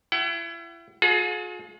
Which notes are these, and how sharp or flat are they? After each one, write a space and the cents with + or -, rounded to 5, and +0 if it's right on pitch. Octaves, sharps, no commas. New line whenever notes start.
E4 +35 F#5 +45
F4 +45 G#4 +35